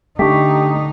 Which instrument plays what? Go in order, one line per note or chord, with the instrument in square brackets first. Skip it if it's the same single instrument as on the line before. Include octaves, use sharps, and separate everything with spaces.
[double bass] D3 D#4 [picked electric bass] A3 D4 [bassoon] G4 [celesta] C#6 D6 B6